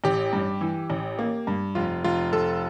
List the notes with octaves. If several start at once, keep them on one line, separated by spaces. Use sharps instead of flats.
A1 G4
G2
E3
A1
A#3
G2
F1 F4
F1 F4
F1 A4